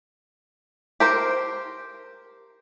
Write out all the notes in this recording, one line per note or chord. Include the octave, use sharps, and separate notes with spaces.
G4 A#4 C5